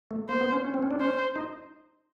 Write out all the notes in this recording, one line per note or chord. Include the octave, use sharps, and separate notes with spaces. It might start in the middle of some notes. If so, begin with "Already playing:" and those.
A3
A#3 C5
B3
C#4
C#4
C4
C#4
D4
C#4 C5
D#4